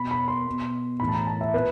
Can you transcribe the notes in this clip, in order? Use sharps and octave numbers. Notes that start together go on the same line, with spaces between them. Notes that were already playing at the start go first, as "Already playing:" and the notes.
Already playing: B2 B5
B5
C6
B2
A2 E3 B5
A5
A#5
A5
E5
A#2 B4